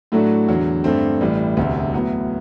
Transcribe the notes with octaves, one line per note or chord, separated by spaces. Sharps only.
A2 F#3 A3 D4 F#4
E2 D3 F#3
G2 D3 A3 C4
A1 A2 G3
E1 D2 C3
A2 F#3 B3